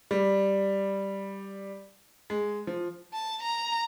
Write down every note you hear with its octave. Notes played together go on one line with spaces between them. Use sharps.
G3
G#3
F3
A5
A#5